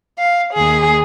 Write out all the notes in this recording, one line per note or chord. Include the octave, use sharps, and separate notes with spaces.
F5
D#2 G#4